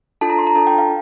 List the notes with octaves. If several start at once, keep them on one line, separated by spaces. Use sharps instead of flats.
D4 F4 A4 A5
A#5
C6
A#5
D4 F4 A4 A5
G5
F5